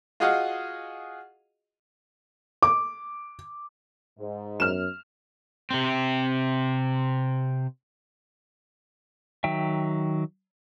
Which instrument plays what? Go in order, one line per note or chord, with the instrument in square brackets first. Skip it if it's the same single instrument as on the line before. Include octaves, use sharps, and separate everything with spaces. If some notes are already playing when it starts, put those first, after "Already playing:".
[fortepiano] F4 F#4 G#4 D#5 F5 F#5
[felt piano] D6
[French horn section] G#2
[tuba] F#2 [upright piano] F6 E7
[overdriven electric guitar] C3 C4
[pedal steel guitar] D#3 F#3 E5 G5